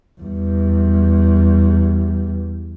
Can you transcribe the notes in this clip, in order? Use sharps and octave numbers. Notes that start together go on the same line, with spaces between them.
E2 G3